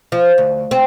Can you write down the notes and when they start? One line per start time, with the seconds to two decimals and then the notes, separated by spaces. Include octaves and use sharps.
0.12 F3
0.38 D2
0.71 C4